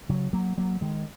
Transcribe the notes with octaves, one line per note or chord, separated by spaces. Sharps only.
C#3 F#3
F#3 A#3
F#3 A#3
D#3 G#3